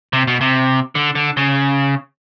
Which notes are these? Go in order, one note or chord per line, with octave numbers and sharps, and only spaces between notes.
C3
B2
C3
D3
D3
C#3